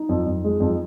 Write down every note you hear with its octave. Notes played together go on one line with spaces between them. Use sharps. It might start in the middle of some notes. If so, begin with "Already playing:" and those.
Already playing: D#4
F2
F2
G#3
F2